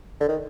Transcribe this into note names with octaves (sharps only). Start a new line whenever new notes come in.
D3
D#3